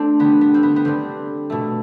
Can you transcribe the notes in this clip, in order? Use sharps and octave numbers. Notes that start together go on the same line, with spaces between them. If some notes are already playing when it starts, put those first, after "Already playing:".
Already playing: A3 C4 D4
D3 G3 B3
B3
C4
B3
B3
D3 G3 C4
B2 A3